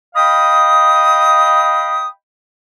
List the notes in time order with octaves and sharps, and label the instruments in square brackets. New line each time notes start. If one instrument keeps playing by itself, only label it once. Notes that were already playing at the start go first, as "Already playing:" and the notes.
[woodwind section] D#5 F5 G5 B5 D#6